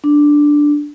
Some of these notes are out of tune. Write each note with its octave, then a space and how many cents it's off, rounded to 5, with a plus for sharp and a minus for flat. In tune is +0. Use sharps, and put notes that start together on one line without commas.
D4 +0